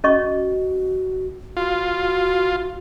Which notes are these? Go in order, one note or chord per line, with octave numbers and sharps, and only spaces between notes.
C#4 F#4 D#5 C#6
F4 F#4